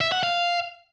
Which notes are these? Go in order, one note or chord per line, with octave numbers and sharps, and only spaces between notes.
E5
F#5
F5